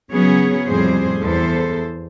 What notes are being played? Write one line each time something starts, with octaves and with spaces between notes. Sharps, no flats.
C#3 F#3 B3 C#4 G#4 C#5
F2 A2 C3 G3 G#4 C5
E2 A4 C5